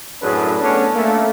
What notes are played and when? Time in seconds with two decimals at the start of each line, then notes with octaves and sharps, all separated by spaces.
0.21 F#2 A2 C#4 D4 G#4 B4
0.60 A3 B3 C#4 D4
0.94 A3 A#3